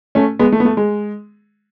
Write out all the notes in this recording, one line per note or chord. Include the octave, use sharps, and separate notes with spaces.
A3 C#4
G#3 B3
A3
B3
A3
G#3